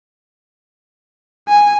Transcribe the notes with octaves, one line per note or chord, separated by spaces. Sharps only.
G#5